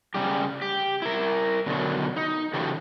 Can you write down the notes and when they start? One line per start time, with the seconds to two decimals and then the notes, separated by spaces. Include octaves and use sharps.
0.14 C#3 G3 G4
0.62 G4
1.02 E4 A#4
1.66 B2 D3 D#3 F#3
2.16 D#4
2.53 C#3 E3 F#4 G4 A4